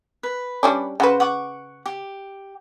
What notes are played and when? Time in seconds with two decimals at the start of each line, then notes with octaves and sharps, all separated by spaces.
0.23 B4
0.63 G3 C#4 D4
1.00 C#3 F#4 B4 C5 F#5
1.20 F#5 C#6 D6
1.86 G4